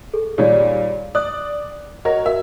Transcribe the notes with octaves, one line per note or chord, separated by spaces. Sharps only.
G#4 A4
A#2 D#3 G3 G#4 C#5 D5
D5 D#6 F#6
F#4 A#4 C#5 D#5 A#6
F#4 A#4 E5